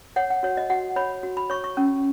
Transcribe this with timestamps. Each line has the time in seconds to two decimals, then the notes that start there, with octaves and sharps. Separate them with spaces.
0.16 C#5 F#5
0.30 F#5
0.43 F#4 C#5
0.57 D#5
0.70 F#4 F#5
0.96 C#5 B5
1.23 F#4
1.37 B5
1.50 C#5 C#6
1.64 C#6
1.77 C#4